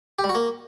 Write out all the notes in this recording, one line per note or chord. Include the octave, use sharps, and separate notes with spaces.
G4
G3
F#4
A#3